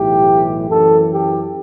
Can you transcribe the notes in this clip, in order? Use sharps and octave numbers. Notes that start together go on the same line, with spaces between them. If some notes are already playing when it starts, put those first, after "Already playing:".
Already playing: B1 A2 E3 G4
F#2 E3 A4
G4